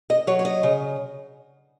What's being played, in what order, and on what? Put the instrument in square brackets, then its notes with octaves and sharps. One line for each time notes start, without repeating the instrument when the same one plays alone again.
[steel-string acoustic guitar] D#5
F#3 C#5
C#5
D#5
C#3